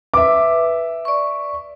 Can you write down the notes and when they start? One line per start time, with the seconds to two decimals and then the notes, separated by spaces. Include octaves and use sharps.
0.14 B4 E5 D6
1.05 D5 C#6